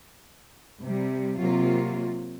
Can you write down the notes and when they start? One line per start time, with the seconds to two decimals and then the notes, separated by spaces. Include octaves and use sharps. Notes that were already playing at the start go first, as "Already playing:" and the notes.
0.82 C3 G3
1.37 C3 F#3 A#3 F4